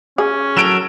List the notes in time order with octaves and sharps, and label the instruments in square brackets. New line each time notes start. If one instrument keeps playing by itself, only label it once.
[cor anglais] C#4 [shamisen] G#4
[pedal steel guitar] F#3 A4 A#4 [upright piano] D7 E7